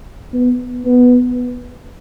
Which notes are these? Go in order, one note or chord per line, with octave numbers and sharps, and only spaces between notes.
B3
B3